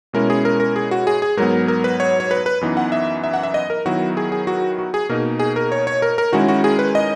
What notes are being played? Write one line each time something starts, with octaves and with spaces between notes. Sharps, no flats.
B2 G#3 C#4 E4 A#4
G#4
A#4
A#4
G#4
F#4
G#4
G#4
G#2 F#3 B3 A#4
A#4
B4
C#5
C#5
B4
B4
F#2 E3 B3 D#4
F#5
E5
E5
F#5
E5
D#5
A#4
D#3 F#3 B3 E4 F#4
G#4
G#4
F#4
F#4
G#4
B2 A#3 D#4 A#4
G#4
A#4
C#5
C#5
A#4
A#4
D#3 G#3 C#4 E4 F#4
F#4
G#4
B4
D#5